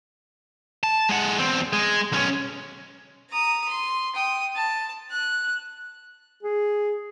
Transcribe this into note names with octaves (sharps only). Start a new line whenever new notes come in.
A5
G#3 F#5
E2 C4
G#3
B1 C#4
A#5 D#6
C6
G5 D#6
A5
F#6
G#4